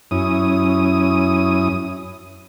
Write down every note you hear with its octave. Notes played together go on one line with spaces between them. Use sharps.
F#2 C#4 E4 D#6